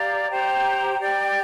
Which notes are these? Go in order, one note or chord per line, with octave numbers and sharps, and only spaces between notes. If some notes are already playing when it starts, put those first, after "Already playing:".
Already playing: G4 D5 F5 A#5
G4 C5 G5 A#5
G4 D5 G5